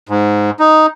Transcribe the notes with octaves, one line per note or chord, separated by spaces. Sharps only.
G#2
D#4